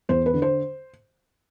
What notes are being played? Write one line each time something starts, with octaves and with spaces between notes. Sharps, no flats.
E2 C5
B4
D3
C5